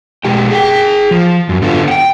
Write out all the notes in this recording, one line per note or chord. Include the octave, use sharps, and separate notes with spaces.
B2 G#3 G4 G5
G#4 F#5 G5
F3
F#2 F#3
D3 B3 F4
F#5 G5